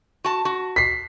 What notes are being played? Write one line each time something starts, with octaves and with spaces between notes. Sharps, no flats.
F#4 A5
F#4
B6 C7